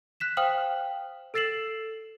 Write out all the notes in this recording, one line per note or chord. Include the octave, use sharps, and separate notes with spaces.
F#6 B6 E7
C5 F5 G5 D#6 F6 F#7
A4 E6 A6 C7 E7 F#7